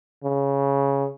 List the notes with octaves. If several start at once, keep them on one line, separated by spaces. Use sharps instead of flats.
C#3